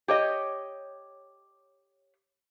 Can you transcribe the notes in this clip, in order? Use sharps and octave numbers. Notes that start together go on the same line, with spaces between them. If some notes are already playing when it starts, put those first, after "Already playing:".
G4 C#5 D#5